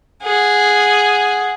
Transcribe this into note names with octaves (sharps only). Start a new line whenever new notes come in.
G#4 F#5